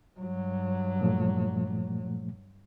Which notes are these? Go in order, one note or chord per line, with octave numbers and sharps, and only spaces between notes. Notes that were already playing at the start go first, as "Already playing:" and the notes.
G2 F#3
A#2 F3 A3